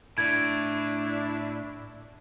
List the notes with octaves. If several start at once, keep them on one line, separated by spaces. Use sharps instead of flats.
A2 D4 E4 G#6